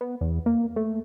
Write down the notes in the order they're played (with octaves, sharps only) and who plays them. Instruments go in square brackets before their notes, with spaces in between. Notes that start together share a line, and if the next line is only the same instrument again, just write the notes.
[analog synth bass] B3
E2
A#3
A3